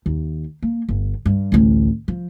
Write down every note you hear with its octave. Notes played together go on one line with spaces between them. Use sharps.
D#2
A#3
G1
G2
A1 D2
F3